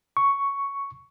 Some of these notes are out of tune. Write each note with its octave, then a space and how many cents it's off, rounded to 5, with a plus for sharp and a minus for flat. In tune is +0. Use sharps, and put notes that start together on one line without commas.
C#6 +5